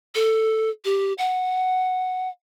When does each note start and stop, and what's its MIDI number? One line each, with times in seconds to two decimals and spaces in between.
0.15 0.70 69
0.85 1.13 67
1.18 2.29 78